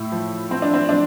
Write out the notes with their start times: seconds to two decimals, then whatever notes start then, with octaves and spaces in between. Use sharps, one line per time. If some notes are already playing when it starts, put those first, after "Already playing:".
Already playing: A2 E4
0.12 F3
0.51 F3 C4
0.62 D4
0.74 C4
0.89 F3 D4